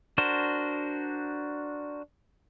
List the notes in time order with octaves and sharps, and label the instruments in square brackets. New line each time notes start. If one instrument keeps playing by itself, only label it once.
[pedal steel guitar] D4 F#4 A#4 C5